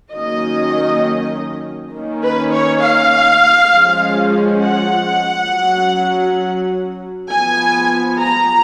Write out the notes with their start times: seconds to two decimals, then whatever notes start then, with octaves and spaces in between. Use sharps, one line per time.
0.14 D#3 F#3 A#3 C#4 D#5
1.93 D#3 A#3 C#4
2.23 B4
2.53 C#5
2.83 F5
3.72 F3 G#3 C#4
4.62 F#5
5.52 F#3 C#4
7.31 F3 B3 G#5
8.21 A#5